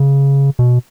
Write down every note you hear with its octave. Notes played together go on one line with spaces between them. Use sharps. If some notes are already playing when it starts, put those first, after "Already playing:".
Already playing: C#3
B2